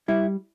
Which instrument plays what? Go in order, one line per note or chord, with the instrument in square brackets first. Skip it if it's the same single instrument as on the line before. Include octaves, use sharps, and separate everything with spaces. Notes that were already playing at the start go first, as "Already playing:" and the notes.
[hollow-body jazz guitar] G3 E4